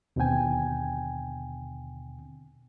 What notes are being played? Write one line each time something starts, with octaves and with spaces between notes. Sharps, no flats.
D#2 B2 D3 C4 G5 G#5